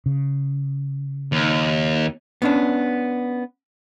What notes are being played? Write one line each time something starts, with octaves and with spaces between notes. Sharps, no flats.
C#3
D#2
B3 C#4 D4